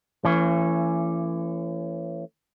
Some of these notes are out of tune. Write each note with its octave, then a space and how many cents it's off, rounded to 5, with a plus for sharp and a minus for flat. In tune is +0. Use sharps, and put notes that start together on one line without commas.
E3 +35 A3 +45 C#4 +0